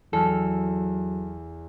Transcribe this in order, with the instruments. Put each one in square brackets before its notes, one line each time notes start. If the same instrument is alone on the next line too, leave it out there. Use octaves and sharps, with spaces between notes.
[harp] E2 F6 [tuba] F#3 [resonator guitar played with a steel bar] A4